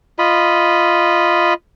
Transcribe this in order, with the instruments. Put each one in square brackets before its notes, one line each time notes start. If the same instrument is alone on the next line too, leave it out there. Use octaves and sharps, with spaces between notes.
[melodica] F4 D#5 B5